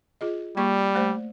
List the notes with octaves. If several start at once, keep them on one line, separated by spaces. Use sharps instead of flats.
F4 G#4 D#5
G3 A#3 D5 C#6
A3 C5 D5